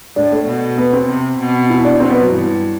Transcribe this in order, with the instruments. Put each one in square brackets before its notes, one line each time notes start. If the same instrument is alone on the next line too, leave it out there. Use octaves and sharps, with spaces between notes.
[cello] A2 [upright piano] D4
[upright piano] A3
[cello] B2
[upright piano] B3
C4
[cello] C3
B2
[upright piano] E4
D4
[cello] B2 [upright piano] C4
[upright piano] B3
F#3
[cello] G2 [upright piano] E3